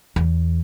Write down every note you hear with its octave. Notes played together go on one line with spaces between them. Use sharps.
E2